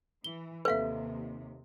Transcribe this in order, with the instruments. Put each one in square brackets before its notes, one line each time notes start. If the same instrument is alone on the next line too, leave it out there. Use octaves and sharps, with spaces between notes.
[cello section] E3 [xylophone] G7
[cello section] D#2 C3 [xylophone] A4 E5 [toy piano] B4 F5